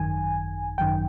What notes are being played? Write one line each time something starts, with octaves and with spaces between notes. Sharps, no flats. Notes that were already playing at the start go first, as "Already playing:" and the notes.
Already playing: G#1 F#2 D#3 G#5
G#1 F#2 D#3 G5